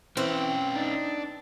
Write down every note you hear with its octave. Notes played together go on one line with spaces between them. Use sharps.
E3 C4 C#4 B4
D4 D#4